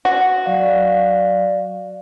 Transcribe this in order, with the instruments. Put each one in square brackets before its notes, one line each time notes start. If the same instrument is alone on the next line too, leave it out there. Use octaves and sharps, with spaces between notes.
[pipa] F#4
[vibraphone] F#3 D5 F5